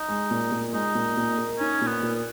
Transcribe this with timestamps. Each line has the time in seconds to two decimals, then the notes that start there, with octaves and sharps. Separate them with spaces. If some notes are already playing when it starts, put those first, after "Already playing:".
Already playing: D#4
0.08 G#3
0.31 A#2
0.52 A#2
0.73 G#3 D#4
0.95 A#2
1.17 A#2
1.38 A#4
1.59 C#4 D#4
1.81 A#2
1.87 B3
2.03 A#2